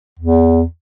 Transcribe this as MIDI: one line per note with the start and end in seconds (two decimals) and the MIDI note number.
0.19 0.63 40